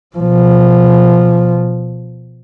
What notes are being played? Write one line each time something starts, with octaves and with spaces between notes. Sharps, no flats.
B2 F3